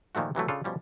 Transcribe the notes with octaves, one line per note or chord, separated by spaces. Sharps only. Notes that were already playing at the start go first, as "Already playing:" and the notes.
A#2 D#3 F3 A3 F#4
C3 E3 F#3 A3
C#3 D4 F4 A4
B2 F3 G3 C#4